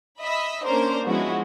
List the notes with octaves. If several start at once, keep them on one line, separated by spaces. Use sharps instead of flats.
D#5 E5 B5
A#3 C#4 D4 A#4 C5
F3 G#3 B3 C#4 E4 F#4